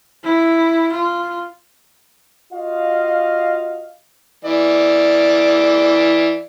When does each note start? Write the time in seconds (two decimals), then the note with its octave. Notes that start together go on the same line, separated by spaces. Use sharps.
0.24 E4
0.92 F4
2.52 F4 F#4 D#5 F5
4.45 E3 D5